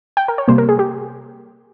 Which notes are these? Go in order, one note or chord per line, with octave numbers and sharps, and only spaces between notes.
G5
A#4
C#5
C3 G3 A#3 C5
A#4
G#4
G4